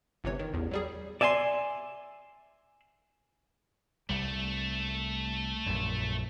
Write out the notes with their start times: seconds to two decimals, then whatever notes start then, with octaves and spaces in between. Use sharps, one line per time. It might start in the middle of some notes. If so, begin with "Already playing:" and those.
0.24 G1 C3 E3 C#5
0.39 D#3
0.54 A1 E2
0.71 F#3 G3 G#4
1.21 D5 E5 G#5 A5 C6
4.09 C2 G3 A3
5.66 A#1 F#2